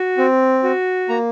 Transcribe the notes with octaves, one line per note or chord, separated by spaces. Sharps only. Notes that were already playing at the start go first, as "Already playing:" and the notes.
Already playing: F#4
C4
F#4
A#3 A#5